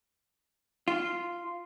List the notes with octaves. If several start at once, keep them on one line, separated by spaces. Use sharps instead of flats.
F4